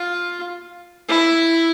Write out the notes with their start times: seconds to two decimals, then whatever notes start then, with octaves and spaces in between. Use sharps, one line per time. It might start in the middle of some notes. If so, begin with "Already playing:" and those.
Already playing: F4
1.09 E4